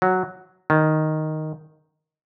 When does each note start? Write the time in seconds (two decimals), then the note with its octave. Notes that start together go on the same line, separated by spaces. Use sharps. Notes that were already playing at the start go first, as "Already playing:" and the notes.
0.02 F#3
0.70 D#3